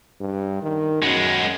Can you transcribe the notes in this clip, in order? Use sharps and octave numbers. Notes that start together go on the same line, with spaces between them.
G2
D#3
F#2 G#3 B3